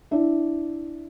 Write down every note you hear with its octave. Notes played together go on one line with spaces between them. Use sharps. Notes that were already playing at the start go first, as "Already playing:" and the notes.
D4 E4